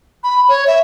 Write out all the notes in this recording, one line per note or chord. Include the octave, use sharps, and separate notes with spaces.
B5
C#5
E5